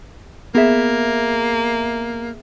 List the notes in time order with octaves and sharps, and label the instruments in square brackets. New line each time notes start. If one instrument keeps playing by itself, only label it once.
[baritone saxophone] A#3 [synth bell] B3 G#4 E5